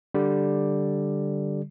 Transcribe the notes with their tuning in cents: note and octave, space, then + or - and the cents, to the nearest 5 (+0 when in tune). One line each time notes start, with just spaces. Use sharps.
D3 +0 G3 +0